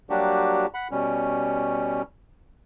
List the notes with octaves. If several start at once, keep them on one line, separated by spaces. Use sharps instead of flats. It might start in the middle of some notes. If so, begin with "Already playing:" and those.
F#3 G3 A#3 D4 F#4 G4
F#5 B5
B2 G3 C#4